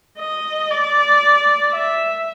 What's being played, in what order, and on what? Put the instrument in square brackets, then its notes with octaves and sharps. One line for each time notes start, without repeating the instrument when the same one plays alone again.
[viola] D#5
D5
E5